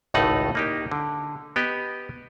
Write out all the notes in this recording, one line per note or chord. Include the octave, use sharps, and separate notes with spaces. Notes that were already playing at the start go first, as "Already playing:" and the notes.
G#1 C#2 A2 A3 D#4 F#5
A#3 D#4 G4
D3
B3 G4 D#5